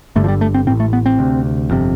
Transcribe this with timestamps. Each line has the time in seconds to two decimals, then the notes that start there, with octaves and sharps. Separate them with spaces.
0.16 G1 G2 D3 A3
0.24 F3
0.28 G3
0.41 A3
0.54 C4
0.67 A2 C4
0.71 A1
0.80 A3
0.93 B3
1.06 C4
1.19 D2 C3
1.70 G1 F2 C3